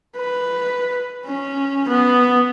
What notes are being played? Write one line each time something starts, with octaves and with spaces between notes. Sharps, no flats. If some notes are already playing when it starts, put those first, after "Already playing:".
B4
C#4
B3